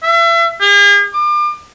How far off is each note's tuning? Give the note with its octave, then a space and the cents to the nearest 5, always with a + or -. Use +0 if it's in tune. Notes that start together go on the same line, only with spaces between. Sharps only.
E5 +35
G#4 -45
D6 +35